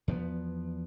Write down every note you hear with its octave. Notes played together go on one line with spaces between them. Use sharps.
E2 F3 A#3 B3